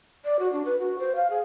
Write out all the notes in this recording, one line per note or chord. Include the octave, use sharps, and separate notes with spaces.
D5
F#4
D4
B4
F#4
C5
F5
G#4